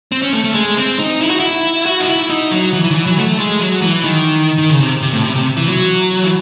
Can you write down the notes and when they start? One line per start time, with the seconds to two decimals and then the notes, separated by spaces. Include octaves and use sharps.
0.12 C4
0.22 C#4
0.33 A3
0.44 A3
0.54 G#3
0.77 C4
0.99 D#4
1.20 E4
1.30 F#4
1.40 E4
1.86 F#4
2.00 D#4
2.08 E4
2.30 D#4
2.51 F#3
2.73 E3
2.84 E3
2.90 D#3
2.95 E3
3.06 F#3
3.17 A3
3.39 G#3
3.60 F#3
3.82 E3
4.04 D#3
4.58 D#3
4.70 C#3
4.80 C3
5.02 C3
5.13 A2
5.24 C3
5.35 C3
5.57 E3
5.68 F#3
6.23 E3